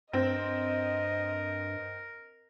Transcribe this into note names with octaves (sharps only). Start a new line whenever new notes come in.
G2 C4 A#4 D#5